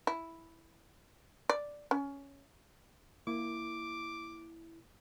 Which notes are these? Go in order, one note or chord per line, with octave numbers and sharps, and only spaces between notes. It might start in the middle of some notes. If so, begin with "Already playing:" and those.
E4
D5
C#4
A#3 E4 D6